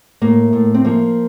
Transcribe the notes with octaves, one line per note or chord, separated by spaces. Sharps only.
A2 A#3
A2
C4
F3 A#3